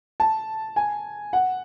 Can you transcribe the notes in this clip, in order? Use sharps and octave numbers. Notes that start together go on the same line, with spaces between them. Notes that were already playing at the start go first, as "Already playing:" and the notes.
A5
G#5
F#5